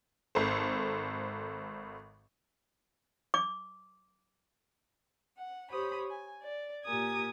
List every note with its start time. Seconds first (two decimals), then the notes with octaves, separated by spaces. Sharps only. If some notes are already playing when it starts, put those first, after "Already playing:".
0.35 G#1 A4 C5
3.34 D6
5.38 F#5
5.71 G4 C5 C#5 B5 D#6
6.09 G#5
6.41 D5
6.85 A#2 G4 A#4 G#5 D#6 G#6